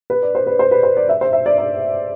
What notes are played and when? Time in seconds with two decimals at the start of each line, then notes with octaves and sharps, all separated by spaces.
0.10 B4
0.22 D5
0.35 C5
0.47 B4
0.59 C5
0.71 B4
0.83 C5
0.97 D5
1.09 E5
1.21 C5
1.33 E5
1.46 D5
1.58 D5